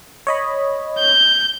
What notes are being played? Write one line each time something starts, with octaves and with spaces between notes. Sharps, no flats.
C#5 D#5 B5
G6